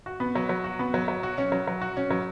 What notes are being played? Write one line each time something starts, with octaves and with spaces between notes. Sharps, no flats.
F#4
B3
F#3
F#3
F#4
B3
F#3
F#3
F#4
C#4
F#3
F#3
F#4
C#4
F#3